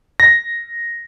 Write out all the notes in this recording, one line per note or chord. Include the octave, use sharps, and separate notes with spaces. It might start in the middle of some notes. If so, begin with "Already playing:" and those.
A#6